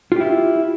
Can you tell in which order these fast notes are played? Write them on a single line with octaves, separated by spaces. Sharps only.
F4 G4 E4